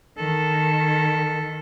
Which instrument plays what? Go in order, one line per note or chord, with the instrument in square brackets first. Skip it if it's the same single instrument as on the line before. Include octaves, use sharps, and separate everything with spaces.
[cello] D#3 [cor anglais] A4